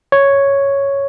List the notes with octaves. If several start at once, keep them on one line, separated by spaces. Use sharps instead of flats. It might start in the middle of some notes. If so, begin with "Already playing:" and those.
C#5